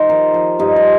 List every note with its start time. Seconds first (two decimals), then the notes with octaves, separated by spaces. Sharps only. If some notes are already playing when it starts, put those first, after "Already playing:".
Already playing: D#3 D#4 F4 G4 C5
0.09 F3 A#4
0.34 F3
0.59 G2 D#4
0.76 F4